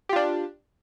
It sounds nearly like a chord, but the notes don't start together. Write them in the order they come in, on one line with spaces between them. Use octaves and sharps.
G4 F4 D4